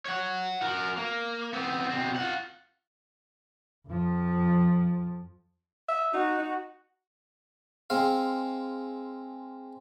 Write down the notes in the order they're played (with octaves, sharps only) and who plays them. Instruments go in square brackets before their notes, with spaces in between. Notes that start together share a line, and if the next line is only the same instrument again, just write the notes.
[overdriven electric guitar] C#5 F#5
F#4 A#4
A#3
B3 C4
B2 C4
F4 F#5
[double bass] F2 F3
[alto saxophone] E5
[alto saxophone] D#4 [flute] F#4
[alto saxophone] D#4
[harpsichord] G#3 C4 F5